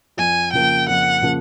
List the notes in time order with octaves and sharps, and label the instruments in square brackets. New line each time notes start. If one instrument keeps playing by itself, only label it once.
[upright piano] F2 [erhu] G#5
[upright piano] C#3 F3 A#3 [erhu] G5
[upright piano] F2 [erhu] F#5
[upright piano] C#3 F3 A#3